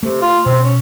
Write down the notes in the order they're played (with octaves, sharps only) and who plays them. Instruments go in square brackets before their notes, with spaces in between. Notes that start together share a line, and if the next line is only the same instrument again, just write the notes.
[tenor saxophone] C3 [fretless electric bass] A3
[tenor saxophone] F4
[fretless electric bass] B2 [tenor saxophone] C4
[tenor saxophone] C#4